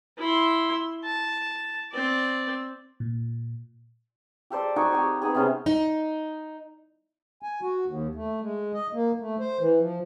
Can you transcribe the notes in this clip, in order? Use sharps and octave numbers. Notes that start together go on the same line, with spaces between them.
E4 C6
A5
C4 D5
A#2
G4 A4 C5 D5
D#4 F#4 G#5 C#6
C4 G4
B3 C4 D#4 G#4
C3 B3 C#4 C5
D#4
G#5
F#4
D#2
A3
G#3
D#5
A#3
A3
C5
E3
F3